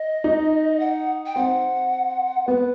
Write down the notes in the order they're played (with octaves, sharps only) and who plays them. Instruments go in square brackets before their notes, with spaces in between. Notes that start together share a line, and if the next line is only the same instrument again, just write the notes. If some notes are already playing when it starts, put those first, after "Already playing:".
Already playing: [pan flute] D#5
[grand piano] D#4
[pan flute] F#5
G5
[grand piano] C4 [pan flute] F#5
[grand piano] B3 [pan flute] B4